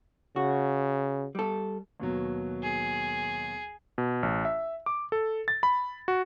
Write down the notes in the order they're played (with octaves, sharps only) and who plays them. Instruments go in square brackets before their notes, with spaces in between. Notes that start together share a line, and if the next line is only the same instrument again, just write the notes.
[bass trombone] C#3 [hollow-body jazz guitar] F#4
[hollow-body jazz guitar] G3 A4
[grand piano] D#2 B2 F#3
[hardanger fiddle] G#4
[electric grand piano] B2
A1
E5
D6
A4
A6
B5
F#4